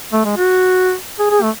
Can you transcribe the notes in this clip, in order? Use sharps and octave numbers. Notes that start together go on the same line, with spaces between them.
A3
G#3
F#4
G#4
G#4
A3